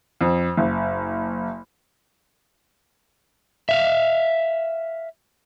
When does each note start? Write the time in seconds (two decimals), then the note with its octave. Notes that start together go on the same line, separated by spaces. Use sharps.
0.21 F2
0.57 F#1
3.69 E5 F5